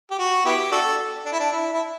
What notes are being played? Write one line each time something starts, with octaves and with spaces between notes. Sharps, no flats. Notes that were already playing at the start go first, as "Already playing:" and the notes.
G4
F#4
B3 E4 G4
D4 F#4 A4
D4
E4
D4
E4
E4